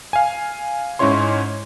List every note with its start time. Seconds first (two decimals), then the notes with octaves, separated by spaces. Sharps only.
0.13 F5 G#5
0.99 G#2 C#4 D#4 E4 C#5 C6